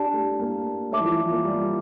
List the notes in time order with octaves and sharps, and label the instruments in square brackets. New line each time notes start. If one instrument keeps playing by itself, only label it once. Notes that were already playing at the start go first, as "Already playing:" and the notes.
Already playing: [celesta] D4 G4 D5 A5
[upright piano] A3
A#3
[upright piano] A3 [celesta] C#5 E5 A5 D6
[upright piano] E3
F3
F3
A#3
G3